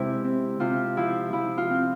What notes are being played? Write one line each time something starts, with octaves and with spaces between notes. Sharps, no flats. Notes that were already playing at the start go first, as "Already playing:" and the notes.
Already playing: C3 G#3 E4 C5 E5
C4
C3 F4
F3 E4
F3 E4
F4
C4